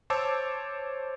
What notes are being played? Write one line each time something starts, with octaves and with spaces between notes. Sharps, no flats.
C5 C#5 A5 D6 E6